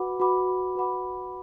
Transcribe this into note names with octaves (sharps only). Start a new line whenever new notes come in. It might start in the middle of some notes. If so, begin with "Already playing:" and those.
Already playing: F#4 B4 F#5 B5 D6
F#4 B4 F#5 B5 D6
F#4 B4 F#5 B5 D6